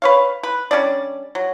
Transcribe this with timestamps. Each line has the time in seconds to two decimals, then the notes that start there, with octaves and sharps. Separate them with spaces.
0.02 B4 C#5 F5
0.43 B4
0.71 G3 C#4 D4 D5
1.35 F#3